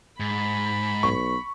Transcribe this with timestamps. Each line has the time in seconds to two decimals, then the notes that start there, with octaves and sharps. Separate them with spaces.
0.20 G#2 B5
1.03 B1 C#6